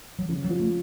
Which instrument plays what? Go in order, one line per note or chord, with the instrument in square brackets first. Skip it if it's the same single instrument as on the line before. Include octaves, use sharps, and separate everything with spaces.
[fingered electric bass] F#3
[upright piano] C#3 [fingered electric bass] F3
[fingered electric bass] F#3
[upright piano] F3
[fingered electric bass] A3